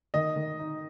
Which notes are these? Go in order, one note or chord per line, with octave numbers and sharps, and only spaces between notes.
D#3 D#5
D#3
D#4